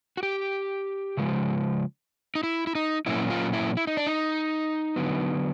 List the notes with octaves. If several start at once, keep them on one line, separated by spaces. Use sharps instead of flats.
F#4
G4
C#3 F3 G#3
D#4
E4
E4
D#4
A#2 F#3 A#3 C#4 E4
F4
E4
E4
D#4
D4
D#4
D3 F#3 B3